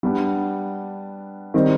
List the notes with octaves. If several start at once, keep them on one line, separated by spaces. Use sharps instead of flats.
G3 B3 D4
D#3 G3 C4 D#4